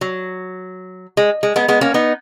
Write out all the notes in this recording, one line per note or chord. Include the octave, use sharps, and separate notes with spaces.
F#3
G#3
G#3
G#3 B3
G#3 B3
A#3 C#4
B3 D#4